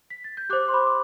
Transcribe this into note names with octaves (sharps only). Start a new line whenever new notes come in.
B6
A6
G6
G4 C5 D6 F#6
C6
B5 D6
D6